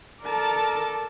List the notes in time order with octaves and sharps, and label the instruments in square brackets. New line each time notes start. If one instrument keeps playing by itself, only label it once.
[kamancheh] A4 D5 [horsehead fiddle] A#4 A5